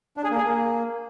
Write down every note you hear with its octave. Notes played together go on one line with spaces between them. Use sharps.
D4
G#4
A#3
G#4
A#3